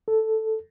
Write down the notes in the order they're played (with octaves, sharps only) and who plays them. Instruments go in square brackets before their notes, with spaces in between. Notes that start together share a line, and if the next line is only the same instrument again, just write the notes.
[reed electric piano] A4